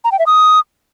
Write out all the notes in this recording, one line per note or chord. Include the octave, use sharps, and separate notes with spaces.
A#5
G5
E5
D#6